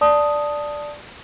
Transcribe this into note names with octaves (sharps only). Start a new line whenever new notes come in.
D5 A5 D#6